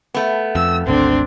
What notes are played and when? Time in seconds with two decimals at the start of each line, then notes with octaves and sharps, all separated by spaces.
0.14 A3 B3
0.55 F2 E6
0.86 G#1 D2 D3 C4 D4